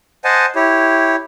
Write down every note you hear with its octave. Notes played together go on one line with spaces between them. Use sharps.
C5 D#5 F#5 G#5 A5
E4 G4 C#5